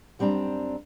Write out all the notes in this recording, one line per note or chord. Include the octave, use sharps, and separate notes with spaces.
F#2 G3 C4 D4 A#5